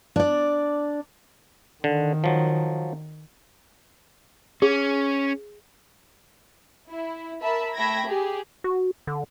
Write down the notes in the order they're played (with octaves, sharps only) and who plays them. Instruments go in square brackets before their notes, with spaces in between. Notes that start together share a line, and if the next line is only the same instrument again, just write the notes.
[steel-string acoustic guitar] D4 D5
[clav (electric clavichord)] D3 [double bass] D#3
[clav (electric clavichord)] F3 F#3
[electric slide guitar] C#4 [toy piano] G#4
[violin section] E4
A#4 E5 A5 B5
A3 E5 G5 B5 G#6 A#6
G4 G#4
[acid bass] F#4
D3